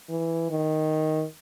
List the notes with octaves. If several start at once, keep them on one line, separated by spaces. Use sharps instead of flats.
E3
D#3